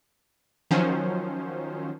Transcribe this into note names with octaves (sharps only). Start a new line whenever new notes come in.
D#3 F3 F#3 C#4 C5